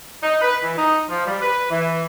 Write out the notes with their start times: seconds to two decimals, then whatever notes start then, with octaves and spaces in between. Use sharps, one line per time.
0.23 D#4
0.42 B4
0.63 E3
0.77 D#4
1.09 F3
1.26 G3
1.41 B4
1.70 E3